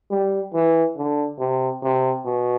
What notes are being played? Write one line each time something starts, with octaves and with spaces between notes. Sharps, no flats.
G3
E3
D3
C3
C3
B2